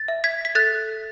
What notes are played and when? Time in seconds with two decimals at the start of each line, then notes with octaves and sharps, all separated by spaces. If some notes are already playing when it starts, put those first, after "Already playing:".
Already playing: A6
0.08 E5
0.24 G#6 B6
0.45 B6
0.55 A4 F#6 A6